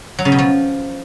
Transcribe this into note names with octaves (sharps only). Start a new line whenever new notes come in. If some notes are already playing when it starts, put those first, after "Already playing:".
F#3
C#3
B2
F3